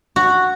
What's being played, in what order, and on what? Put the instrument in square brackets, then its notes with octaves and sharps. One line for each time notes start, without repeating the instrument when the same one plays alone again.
[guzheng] F#4